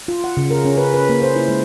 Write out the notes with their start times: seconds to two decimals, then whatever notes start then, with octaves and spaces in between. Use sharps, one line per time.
0.08 F4
0.24 F#5
0.37 C#3
0.51 A#4
0.65 C#4
0.77 B4
0.94 B4
1.09 A#3
1.22 C5
1.36 E4
1.49 G#3